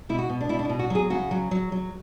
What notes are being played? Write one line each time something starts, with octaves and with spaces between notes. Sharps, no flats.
B2 E4
F#4
B2
D4
B2 E4
D4
E4
B2
F#4
F#3 G#4
C#3 F#4
F#3
F#3
F#3